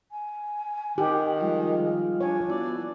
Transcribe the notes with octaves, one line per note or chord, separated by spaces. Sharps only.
G#5
D#3 G4 F#5
F3 G3 G#3 F4
D4 C#5 G#5
B3 E4 F#4 D5